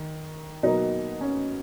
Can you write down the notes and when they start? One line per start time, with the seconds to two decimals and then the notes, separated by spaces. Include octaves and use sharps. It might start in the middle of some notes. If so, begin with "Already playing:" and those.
Already playing: D#3
0.63 B2 F#3 A#3 D#4
1.21 C#4